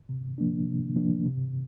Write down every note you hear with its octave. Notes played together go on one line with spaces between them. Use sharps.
C3
F3 A#3 D4
C3
F3 A#3 D4
C3